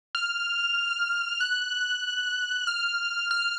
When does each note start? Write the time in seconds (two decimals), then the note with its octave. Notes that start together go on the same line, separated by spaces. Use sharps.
0.15 F6
1.41 F#6
2.67 F6
3.31 F6